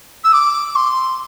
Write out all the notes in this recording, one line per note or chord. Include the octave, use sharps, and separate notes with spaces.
E6
D6
C6